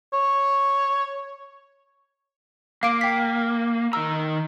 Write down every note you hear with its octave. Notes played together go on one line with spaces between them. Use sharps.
C#5
A#3 F5 D6 D7
G5 B6
D#3 A#4 A#5 E6